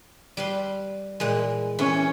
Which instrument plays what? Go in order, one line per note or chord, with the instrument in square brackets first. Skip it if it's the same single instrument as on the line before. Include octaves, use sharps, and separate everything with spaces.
[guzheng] G3 B4 C6
A#2 E3 G#3
[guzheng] E3 [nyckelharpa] C#4